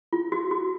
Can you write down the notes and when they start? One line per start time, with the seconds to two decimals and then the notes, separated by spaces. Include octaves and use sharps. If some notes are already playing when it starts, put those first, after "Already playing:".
0.13 F4
0.32 F#4
0.51 F#4